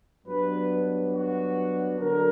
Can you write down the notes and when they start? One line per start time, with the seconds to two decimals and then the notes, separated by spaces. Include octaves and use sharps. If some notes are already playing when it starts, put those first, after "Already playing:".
0.25 G2 F#3 B3 D4 B4
1.12 F#4
1.99 D3 F#3 A#4